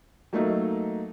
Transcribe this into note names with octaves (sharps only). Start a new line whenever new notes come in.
F#3 A3 A#3 D#4